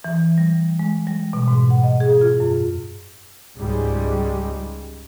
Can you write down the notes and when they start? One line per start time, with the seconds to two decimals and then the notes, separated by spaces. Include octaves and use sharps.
0.04 E3
0.38 G3
0.79 G#3
1.07 G3
1.33 B2
1.48 G#2
1.70 F#5
1.84 D#5
2.00 G#4
2.21 F4
2.40 F#2
3.57 C#2 G#2 G3 G#3